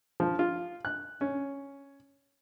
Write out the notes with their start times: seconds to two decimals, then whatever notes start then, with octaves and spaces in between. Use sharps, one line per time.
0.20 F3
0.39 F4
0.85 F#6
1.21 C#4